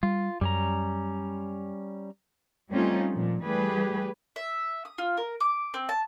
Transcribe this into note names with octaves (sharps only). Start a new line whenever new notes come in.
G3 F4
F#2 G3 C#4 A#5
G3 A3 C4 C#4 D#4 F4
A#2 F3
E3 G3 A3 G4 G#4 B4
E5
D#6
F4
A#4
D6
C4
A5